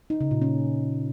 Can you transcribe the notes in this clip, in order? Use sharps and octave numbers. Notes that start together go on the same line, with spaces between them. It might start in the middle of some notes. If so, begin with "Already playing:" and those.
D#4
C#3
A#2
C#4